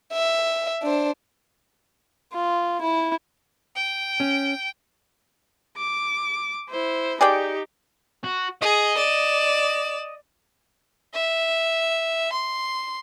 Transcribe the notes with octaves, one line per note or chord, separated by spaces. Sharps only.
E5
D4 C5
F4
E4
G5
C#4
D6
E4 C5
D#4 G4 G#4 D5 G5
F#4
G#4 D#5
D5 E7
E5
C6